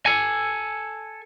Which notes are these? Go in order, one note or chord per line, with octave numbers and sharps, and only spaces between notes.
A4 G#5